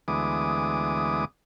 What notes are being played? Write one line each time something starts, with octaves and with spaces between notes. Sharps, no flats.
D2 E3 G#3 B3 D6 D#6